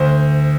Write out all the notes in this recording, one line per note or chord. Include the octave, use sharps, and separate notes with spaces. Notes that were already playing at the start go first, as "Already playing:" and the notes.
Already playing: D2 C5